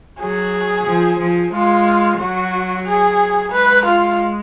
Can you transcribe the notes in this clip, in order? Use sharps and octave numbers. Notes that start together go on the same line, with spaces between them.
F#3 G#4
F3
F3
G#3 F4
F#3 F#4
G#4
G#3 B4
F4